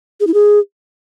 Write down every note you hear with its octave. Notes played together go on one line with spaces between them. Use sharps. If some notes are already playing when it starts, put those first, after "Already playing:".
G#4
E4
G#4